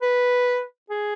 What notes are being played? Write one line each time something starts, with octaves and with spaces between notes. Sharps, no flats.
B4
G#4